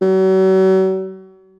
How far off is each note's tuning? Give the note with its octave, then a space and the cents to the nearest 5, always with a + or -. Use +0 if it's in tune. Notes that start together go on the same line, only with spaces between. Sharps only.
F#3 +40